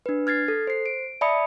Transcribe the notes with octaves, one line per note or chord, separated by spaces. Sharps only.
D4 B4
F6 G#6 A6 C7
A4
C5 C7
D7
D5 E5 A5 B5 D#6 C#7